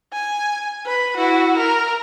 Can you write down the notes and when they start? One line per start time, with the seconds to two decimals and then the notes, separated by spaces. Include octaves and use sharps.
0.13 G#5
0.86 B4
1.17 E4 F#4
1.57 A#4